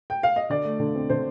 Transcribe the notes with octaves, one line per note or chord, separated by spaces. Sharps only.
G5
F5
D#5
D3 D5
A3
D3
C4
D3 C5